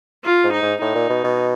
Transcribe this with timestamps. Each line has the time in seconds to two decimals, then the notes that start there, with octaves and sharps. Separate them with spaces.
0.25 F4
0.44 G#2
0.53 D#4
0.62 G#2
0.81 A2 D#4
0.95 A#2
1.09 B2
1.24 B2